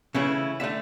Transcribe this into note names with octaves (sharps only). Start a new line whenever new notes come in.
C#3 E3 A3 C#4 E4
D3 A3 E5